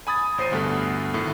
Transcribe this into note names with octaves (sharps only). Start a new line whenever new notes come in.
G#5 B5 D#6 G#6 A6
A1 C5 C7 D#7
D2 G2 B3 A4 B6
D2 A2 D#3